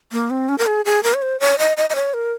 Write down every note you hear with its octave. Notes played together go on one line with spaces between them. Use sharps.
A#3
C4
C#4
A#4
G#4
G#4
A#4
C#5
C5
C#5
D#5
D#5
D#5
C#5
A#4